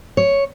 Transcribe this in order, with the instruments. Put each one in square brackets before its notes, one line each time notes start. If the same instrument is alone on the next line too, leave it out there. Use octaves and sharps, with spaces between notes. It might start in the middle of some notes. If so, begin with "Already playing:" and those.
[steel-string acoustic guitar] C#5